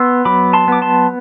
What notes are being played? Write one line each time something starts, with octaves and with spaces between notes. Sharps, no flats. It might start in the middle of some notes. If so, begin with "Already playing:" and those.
Already playing: B3 C6 E6
F#3 B5 D6
A5 C6
B3 D6
A5 C6